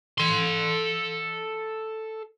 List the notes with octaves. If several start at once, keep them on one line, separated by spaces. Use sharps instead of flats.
A4 C6